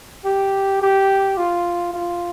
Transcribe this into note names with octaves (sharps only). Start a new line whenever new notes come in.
G4
G4
F4
F4